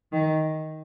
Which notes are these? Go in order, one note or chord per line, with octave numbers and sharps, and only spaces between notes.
D#3